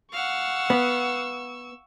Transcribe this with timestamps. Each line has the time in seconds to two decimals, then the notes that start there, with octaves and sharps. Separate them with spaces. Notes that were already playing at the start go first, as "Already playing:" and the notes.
0.12 F5 F#5 C#6 E6
0.70 B3